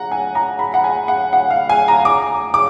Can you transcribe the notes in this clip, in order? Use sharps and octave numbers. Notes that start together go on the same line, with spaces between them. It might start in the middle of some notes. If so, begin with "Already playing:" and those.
Already playing: F#5 A#5
G#5
A#5
B5
F#5
G#5
F#5
F#5
F5
G#5
A#5
D6
D6